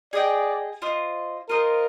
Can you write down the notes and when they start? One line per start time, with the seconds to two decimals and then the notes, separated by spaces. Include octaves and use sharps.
0.13 G#4 D5 D#5 G5
0.82 F4 C5 D#5
1.49 F4 A#4 C5 D#5